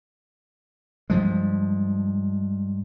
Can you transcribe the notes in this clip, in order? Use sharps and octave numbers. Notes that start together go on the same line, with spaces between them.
G2 F3 G#3